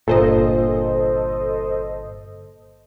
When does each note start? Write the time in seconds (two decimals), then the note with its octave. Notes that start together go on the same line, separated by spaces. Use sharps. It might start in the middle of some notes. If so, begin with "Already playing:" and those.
0.08 G1 A#2 A4 C5 D#5